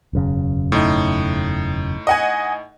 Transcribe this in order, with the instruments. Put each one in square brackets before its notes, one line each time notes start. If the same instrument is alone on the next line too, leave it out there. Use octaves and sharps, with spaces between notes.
[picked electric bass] E1 F#2 C#3
[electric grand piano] A2 D#4
[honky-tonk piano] D#5 F#5 G#5